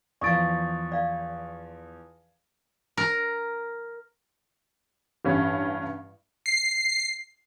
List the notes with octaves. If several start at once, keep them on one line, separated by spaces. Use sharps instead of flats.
E2 F3 D5 F5 C#6 D#6 A6 D7
D5 F5
A#4
A1 G2 C#4
C7